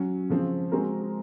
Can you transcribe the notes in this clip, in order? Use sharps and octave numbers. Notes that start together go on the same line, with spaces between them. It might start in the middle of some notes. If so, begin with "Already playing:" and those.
Already playing: F#3 C#4 F#4
C#3 F3 C4
G#3 C4 F#4 A#4